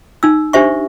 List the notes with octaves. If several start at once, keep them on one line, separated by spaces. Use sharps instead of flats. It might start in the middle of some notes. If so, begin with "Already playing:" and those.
D#4 E6
D4 G4 C5 E5 C#6